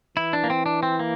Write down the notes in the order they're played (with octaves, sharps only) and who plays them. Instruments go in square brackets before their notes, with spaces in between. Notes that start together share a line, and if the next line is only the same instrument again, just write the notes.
[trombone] E3 [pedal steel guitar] E4
[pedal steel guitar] D4
A#3
C4
D4
C4
A#3